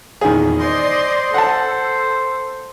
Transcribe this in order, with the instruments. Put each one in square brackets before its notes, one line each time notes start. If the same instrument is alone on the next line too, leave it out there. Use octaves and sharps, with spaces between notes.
[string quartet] E2 A#2 [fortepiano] D#3 G#4
[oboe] C5 [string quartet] D5 D#5 C6
[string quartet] A4 [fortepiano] F#5 A5